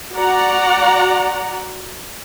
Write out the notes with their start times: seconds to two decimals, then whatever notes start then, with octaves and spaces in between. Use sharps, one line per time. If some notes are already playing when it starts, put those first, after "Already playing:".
0.13 F#4 D5 F#5 A#5